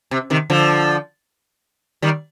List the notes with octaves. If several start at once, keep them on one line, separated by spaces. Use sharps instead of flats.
C3
C3 D#3
D3 F3
D#3 G3